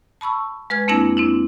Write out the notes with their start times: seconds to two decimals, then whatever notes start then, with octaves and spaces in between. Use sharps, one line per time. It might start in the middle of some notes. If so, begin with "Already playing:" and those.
0.21 A5 B5 C#6 E6
0.70 G#3 B4 F6 G#6
0.88 F2 A#3 C4 D4 E4 A#6
1.17 C4 D4 E4